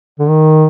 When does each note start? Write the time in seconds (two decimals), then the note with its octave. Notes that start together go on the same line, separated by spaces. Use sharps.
0.19 D3
0.28 D#3